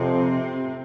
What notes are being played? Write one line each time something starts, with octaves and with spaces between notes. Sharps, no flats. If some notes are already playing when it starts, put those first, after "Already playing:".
Already playing: F2 C3 C4